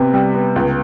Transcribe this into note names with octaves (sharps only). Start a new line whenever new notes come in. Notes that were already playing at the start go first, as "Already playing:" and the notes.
Already playing: C3 B3
G3
B3
C#2